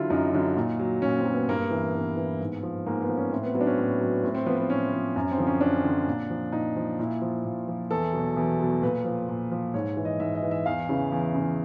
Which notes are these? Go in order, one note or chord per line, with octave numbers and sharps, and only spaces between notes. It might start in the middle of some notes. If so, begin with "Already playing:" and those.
Already playing: D3 F#3 E4 F4
F#2 D#4
D3 F#3
A#2
F#3
A#2 C#4
C4
F#3
B3
G2 A#3
E3
G2 B3
E3
G#2
F3
G#2 A#3
B3
F3
C#4
A2 C4
B3
F#3 B3
D4
C#4
A2
F#3
A2 C4
C4
F3 B3
B3
A2 C#4
F3
F#2
C4
D3 F3
C#4
F#2 D4
D3 F3
A#2
F3
A#2 D#4
F3
A#2 E4
F3
A#2
F3
E2 A4
B2 F#3
E2
B2 F#3
A#2 B4
F3
A#2
F3
G#2 C#5
E3
D#5
G#2 E5
D#5
E3
E5
E2 F5
C#3 E3
E2
C#3 E3